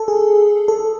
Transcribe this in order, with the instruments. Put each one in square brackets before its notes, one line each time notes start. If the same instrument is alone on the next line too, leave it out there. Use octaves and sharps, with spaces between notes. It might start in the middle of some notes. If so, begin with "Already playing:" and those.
Already playing: [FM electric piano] A4
G#4
A4